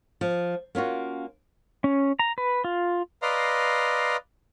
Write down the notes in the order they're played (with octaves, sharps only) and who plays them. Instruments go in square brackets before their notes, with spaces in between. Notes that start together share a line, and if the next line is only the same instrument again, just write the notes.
[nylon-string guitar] F3
A#3 C#4 F4 F#4
[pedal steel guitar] C#4
A#5
B4
F4
[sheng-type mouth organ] B4 D5 D#5 F5 A#5 C6